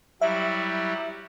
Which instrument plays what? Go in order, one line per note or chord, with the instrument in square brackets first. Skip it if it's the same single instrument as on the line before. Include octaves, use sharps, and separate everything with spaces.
[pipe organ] F#3 G3 E4 [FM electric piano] E5